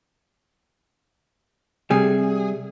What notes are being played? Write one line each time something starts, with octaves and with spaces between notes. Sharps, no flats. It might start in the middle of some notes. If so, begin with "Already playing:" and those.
C3 G3 G#4